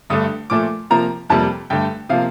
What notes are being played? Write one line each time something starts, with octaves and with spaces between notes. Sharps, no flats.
G2 D3 A3 D#6
A#2 F3 A3 D6
C3 F3 A#3 A#5
F2 C3 G3 A#3 A5
G2 D3 A3 G5
C3 F3 A#3 F5